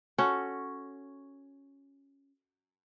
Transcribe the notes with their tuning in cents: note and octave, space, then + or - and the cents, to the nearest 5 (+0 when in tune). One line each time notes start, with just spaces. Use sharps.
C#4 +0 F#4 +0 A4 +0